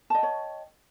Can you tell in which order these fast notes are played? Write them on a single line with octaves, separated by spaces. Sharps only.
A5 D#5 G5 C#5